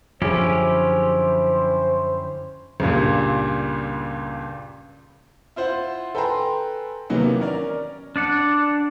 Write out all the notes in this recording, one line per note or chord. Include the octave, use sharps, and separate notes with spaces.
F#2 D3 F3 C#4 E4 G4 G#4 C5
C#2 G2 A#2
E4 F4 C5 F#5
A4 B4 G5 G#5 A#5 C6
C3 D#3 E3 F#3 A#3 B3
C#4 A#4 D5
D4 D5 F#5